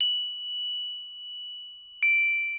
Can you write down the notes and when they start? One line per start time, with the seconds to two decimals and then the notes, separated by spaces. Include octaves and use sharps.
0.01 F#7
2.03 D7